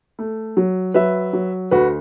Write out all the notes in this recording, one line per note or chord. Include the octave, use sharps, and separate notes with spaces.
A3
F#3
F#3 B4 E5
F#3
D2 F#4 B4